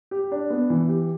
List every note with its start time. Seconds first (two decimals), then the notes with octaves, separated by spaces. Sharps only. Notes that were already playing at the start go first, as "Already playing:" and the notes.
0.11 G4
0.31 D4
0.50 B3
0.70 E3
0.89 G4